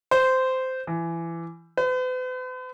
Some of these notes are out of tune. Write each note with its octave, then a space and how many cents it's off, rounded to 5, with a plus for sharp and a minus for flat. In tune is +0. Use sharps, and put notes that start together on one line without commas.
C5 -15
E3 +25
B4 +45